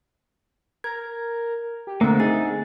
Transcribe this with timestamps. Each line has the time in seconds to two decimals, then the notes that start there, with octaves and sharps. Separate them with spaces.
0.84 A#4 G#6
1.87 G4
2.01 D3 A3 A#3 C4 E5
2.20 D#4 G#4 A6